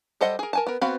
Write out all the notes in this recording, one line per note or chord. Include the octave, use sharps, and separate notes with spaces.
G3 A4 C5 D#5 F#5
G#4 A#4
A#4 G#5 A5
B3 A#4
B3 C4 F#4 F5 B5